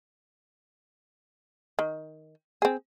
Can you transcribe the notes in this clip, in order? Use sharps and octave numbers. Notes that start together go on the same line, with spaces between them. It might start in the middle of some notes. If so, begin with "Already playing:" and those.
D#3
C4 G#4